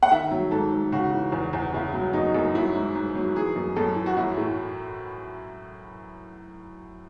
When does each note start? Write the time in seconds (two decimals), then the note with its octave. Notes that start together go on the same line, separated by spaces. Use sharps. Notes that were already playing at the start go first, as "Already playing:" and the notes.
0.03 F#5
0.11 D#3 E5
0.31 F#3
0.51 G#2 A4
0.72 G#2
0.92 C#3 F#4
1.13 E3
1.32 E2
1.53 E2
1.73 C#3 E4
1.93 F#3
2.13 F#2 D#4
2.35 F#2
2.55 F#3 E4
2.75 G#2
2.95 G#2
3.15 F#3
3.35 E3 G#4
3.56 F#2
3.76 F#2 A4
3.96 E3
4.06 F#4
4.17 F#3 E4
4.37 A2